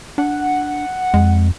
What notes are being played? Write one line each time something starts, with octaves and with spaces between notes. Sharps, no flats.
D4 F#5
F2 G#3